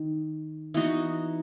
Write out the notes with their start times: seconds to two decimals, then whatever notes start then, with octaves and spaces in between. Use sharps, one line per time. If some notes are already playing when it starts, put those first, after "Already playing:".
Already playing: D#3
0.74 E3 B3 D#4 F#4